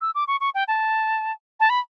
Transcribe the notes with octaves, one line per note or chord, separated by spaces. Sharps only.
E6
D6
C#6
C#6
G5
A5
A5
B5